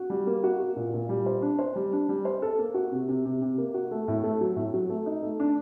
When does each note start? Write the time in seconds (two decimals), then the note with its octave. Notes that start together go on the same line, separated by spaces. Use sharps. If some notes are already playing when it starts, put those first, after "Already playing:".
Already playing: F#4
0.10 G3
0.27 A#3
0.43 F#4
0.60 F#4
0.76 A#2
0.94 A#2
1.09 G3
1.26 C5
1.42 D4
1.59 C5
1.76 G3
1.93 D4
2.09 G3
2.25 C5
2.42 A4
2.59 A#3
2.74 F#4
2.92 C3
3.09 C3
3.25 C3
3.42 C3
3.58 A#3
3.74 F#4
3.91 A3
4.08 A2
4.23 A3
4.41 F#3
4.56 A2
4.74 F#3
4.89 A3
5.06 D#4
5.22 A3
5.40 D4